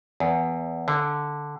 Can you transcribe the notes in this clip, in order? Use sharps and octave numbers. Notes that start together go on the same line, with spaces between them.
E2
D3